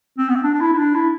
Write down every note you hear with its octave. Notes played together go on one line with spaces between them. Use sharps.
C4
B3
C4
D4
D4
E4
E4
D4
E4